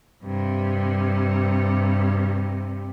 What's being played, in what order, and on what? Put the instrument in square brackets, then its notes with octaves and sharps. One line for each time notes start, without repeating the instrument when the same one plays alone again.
[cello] G2 C3